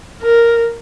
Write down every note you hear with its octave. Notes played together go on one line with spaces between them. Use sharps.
A#4